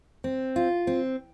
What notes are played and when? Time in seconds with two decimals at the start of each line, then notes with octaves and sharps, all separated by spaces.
0.24 C4
0.56 F4
0.87 C4